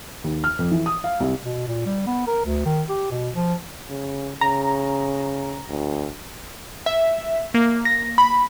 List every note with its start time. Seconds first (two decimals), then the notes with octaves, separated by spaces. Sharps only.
0.24 D#2
0.44 F6
0.59 F2
0.72 E3
0.86 D#6
1.04 F5
1.20 C2
1.45 B2
1.67 A#2
1.86 G3
2.07 B3
2.27 A#4
2.46 D2
2.66 D#3
2.89 G4
3.11 B2
3.35 F3
3.90 C#3
4.41 C#3 A#5
5.69 D2
6.86 E5
7.54 A#3
7.85 A#6
8.18 B5